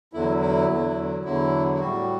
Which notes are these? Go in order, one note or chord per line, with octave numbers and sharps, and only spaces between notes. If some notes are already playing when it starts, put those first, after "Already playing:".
E2 D3 F#3 E4
E4
E2 D3 F#3
E2 D3 F#3 E4
E4
A2 G3 F#4